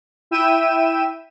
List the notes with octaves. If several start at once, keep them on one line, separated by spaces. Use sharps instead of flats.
E4 E5 G5 D#7 E7